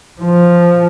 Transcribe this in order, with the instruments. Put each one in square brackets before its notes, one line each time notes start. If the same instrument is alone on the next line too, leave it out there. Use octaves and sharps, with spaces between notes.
[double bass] F3